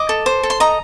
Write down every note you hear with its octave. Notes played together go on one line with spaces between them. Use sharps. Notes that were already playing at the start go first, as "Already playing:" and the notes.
Already playing: D#5 D6
A4
C5
A4
C6
D#5 A#5